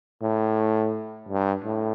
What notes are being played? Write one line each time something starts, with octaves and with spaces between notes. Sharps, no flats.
A2
G2
A2